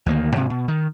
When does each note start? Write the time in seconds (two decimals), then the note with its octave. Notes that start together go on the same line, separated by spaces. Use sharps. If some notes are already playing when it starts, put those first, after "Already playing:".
0.06 D2 D#3 G3 A#3
0.36 G#2 C3
0.50 B2
0.68 D#3